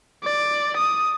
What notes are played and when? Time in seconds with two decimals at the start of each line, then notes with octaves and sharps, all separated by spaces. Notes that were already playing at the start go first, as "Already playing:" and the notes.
0.24 D5
0.77 D#6